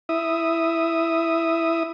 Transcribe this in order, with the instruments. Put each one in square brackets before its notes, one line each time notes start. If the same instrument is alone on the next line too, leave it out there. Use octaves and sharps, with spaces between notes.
[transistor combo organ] E4 E5 D#6